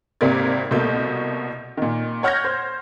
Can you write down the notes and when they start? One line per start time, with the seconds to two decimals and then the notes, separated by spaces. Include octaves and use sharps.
0.21 G#1 C3 A#3 A#4 D5 G#6
0.71 C2 B2 A3 A#3 G6
1.77 A#2 D#3
2.23 C#5 F#5 F6 G6 G#6 A#6
2.45 C5